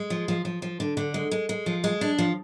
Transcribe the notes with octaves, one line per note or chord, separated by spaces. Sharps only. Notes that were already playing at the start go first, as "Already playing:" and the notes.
Already playing: G#3
F3
F3
F3
F3
D3
D3
G#3
G#3
G#3
F3
G#3
D4
F3